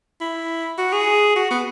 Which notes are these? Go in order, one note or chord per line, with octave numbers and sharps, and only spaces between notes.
E4
F#4
G#4
F#4
B3